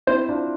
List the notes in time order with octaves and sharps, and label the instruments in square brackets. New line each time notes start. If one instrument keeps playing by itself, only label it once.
[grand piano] C4 E4 [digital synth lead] C5
[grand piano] D4 F4